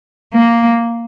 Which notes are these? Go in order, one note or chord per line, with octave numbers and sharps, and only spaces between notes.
A#3